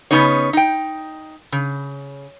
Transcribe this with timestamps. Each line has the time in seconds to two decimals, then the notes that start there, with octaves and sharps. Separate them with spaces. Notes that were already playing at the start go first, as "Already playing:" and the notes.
0.11 C#3 B3 C#4 D#4 C#5
0.53 D#4 G5
1.52 C#3